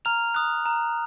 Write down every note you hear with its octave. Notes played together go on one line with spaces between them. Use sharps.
A#5 F6 F7
D#6 F#6
A#5